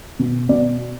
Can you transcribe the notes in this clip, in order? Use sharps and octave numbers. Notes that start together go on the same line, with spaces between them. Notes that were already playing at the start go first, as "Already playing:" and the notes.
B2
B2 D5